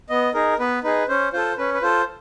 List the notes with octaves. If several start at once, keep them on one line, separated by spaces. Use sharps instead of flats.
B3 D#5
D#4 G#4 A#4
B3 B4
D#4 G#4 B4
C#4 C5
F4 A4 C5
C#4 B4
B4
F4 A4 C5